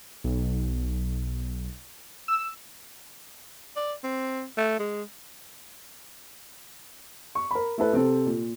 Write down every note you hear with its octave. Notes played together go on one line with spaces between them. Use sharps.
B1
E6
D5
C4
A3
G#3
C#6
A#4 B5
A3 E4 A4 B4
C3 C4 A4
A#2